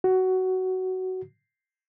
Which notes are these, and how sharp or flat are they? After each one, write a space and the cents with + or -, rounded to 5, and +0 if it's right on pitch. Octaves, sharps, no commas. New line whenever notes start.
F#4 +15